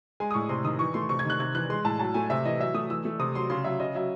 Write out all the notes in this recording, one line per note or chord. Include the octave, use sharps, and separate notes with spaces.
G#3 G#5
D#6
A2 C#6
C3 C6
D#3 D#6
E3 C#6
A3 C6
C3 C#6
G#6
D#3 F#6
C3 G#6
E3 F#6
G#3 C6
A2 A5
F#3 A5
A3 G#5
C3 E5
E3 D#5
F#3 E5
A3 D#6
E3 E6
A3
C3 D#6
F#3 C6
C#3 C6
F#3 E5
C#3 D#5
F#3 E5